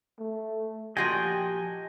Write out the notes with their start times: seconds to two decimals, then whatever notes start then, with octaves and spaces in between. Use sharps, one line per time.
0.19 A3
0.97 A#2 F3 F#4 G4 D#5 G5 G#5